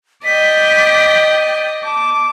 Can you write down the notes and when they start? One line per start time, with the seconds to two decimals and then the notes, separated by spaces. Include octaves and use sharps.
0.25 D5 D#5 G5 B6
1.84 A5 D6